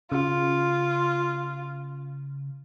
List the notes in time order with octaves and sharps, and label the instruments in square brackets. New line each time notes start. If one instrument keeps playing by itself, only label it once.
[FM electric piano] C#3 [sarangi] F4